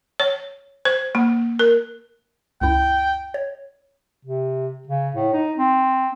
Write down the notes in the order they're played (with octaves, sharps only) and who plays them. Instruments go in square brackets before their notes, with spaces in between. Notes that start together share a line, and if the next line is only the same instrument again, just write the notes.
[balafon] C#5
C5
A#3
A#4
[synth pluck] C#2 F#2 E4 [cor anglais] G5
[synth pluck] C#5
[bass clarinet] C3
C#3
A2
D#4
C4